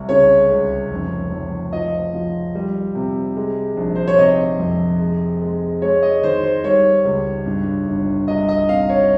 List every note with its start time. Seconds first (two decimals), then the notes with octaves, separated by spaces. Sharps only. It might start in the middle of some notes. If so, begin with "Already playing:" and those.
Already playing: C2
0.09 C#3 C#5
0.50 C#2
0.91 F1
1.31 F1
1.73 F3 D#5
2.13 F3
2.55 G3
2.95 C3
3.36 G#3
3.77 A#1
3.95 C5
4.08 C#5
4.19 C3 D#5
4.59 F2
5.00 G#3
5.42 G#3
5.82 G#3 C#5
6.03 D#5
6.23 D#3 C5
6.44 C5
6.64 G3 C#5
7.05 C#2
7.46 G2
7.87 G1
8.28 C2 D#5
8.48 D#5
8.69 C3 F5
8.89 C#5